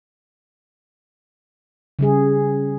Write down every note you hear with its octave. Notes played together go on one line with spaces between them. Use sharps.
C#3 G3 G#4